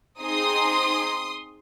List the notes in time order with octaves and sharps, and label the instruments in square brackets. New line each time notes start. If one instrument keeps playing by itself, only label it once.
[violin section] C4 D#4 G#4 C6 D#6